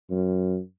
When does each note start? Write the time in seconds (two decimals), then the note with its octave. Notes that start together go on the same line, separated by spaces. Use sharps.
0.10 F#2